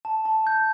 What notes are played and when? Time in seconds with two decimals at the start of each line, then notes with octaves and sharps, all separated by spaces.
0.05 A5
0.25 A5
0.47 G6